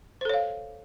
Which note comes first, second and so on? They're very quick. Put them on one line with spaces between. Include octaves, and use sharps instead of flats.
C5 A4 C#5 F5